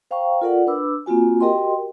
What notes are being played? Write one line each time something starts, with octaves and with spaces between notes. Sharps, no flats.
C5 F5 G5 A#5 C#6
F4 A4 A#4 D5 F#5
D4 B4 B5 D6 E6
A#3 C4 F4 F#4 G#5
F#4 G4 A#4 D#5 G5 C6